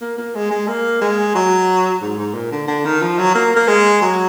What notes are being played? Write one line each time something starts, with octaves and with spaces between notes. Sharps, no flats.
A#3
A#3
G#3
G#3
A#3
G#3
F#3
G#2
G#2
A#2
D3
D3
D#3
F3
F#3
A#3
A#3
G#3
F#3